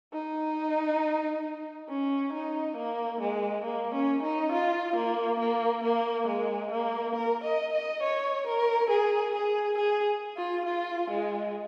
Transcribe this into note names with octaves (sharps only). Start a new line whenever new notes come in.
D#4
C#4
D#4
A#3
G#3
A#3
C#4
D#4
F4
A#3
A#3
A#3
G#3
A#3
A#4
D#5
D#5
C#5
A#4
G#4
G#4
G#4
F4
F4
G#3